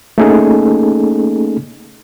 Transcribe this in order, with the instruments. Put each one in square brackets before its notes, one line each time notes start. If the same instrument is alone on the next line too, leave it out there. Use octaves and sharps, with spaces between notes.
[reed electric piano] A3 A#3 C#4 D#4 G#4 A4